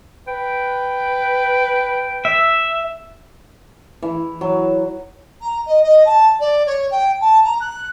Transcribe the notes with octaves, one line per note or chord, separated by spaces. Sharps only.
B4 G5
E5
E3
F#3
A#5
D#5
D#5
A5
D5
C#5
G5
A5
A#5
F#6